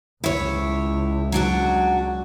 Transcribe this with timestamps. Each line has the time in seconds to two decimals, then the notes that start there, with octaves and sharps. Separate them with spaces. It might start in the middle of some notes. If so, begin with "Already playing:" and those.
0.24 C#2 E4 C#5
1.32 F#3 D4 F#4